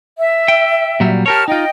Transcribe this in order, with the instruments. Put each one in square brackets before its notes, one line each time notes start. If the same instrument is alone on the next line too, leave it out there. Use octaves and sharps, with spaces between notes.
[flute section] E5
[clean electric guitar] G5
A#2 F#3 G3
[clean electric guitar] G4 A#4 C#5 [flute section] A5 F6
[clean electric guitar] D#4 F4 [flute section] D#5 G5